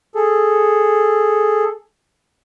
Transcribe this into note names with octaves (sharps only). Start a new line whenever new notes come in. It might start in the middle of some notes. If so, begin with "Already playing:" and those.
G#4 A4